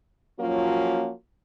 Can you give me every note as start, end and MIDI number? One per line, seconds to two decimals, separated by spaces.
0.39 1.10 53
0.39 1.10 54
0.39 1.10 58
0.39 1.10 61
0.39 1.10 65
0.39 1.10 66